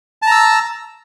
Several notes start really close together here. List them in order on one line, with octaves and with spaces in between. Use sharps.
A5 A#5 E6